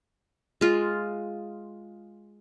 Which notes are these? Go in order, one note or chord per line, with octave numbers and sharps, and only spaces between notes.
G#3 F4